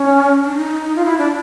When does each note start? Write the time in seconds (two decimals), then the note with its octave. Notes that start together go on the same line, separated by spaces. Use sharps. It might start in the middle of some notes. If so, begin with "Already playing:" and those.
Already playing: C#4
0.44 D4
0.56 D#4
0.96 F4
1.05 E4
1.18 D4